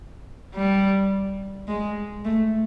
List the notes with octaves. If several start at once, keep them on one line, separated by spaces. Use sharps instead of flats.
G3
G#3
A3